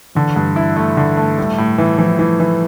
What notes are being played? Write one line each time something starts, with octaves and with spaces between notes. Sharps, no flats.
D3 E3
G2
E4
A3
D3
A3
A2 G3
A2
E3
E3 F3
E3
E3